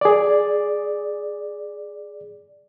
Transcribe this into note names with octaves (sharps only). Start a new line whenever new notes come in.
G#4 D5